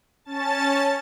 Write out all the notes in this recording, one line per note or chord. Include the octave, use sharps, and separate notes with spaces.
C#4 A5 A6